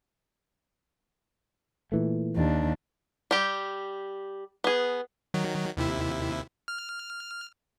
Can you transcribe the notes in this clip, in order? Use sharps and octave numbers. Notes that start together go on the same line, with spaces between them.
A#2 E3 A3
D#2 D4
G3 G4
B3 G#4
D#3 F#3
D#2 C3 E4
F6